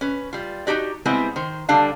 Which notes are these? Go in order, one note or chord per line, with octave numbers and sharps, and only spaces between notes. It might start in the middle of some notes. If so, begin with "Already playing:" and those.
C#4 B4
G3 F4
D#4 F#4 G4 D5
G3 G#3 B3 C4 E4
D#3 C5
D3 G3 D4 F5 A5